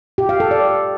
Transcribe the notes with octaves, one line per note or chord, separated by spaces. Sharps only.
G4
F5
A4
D5